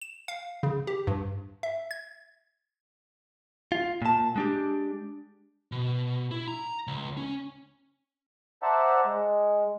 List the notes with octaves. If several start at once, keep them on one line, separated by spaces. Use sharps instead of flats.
E7
F5
C#3
G4
G2
E5
G#6
F4
A#2 A5
G#3 D4 G4
B2
E4
A#5
C#2
C#4
C5 D5 E5 F#5 A5 A#5
G#3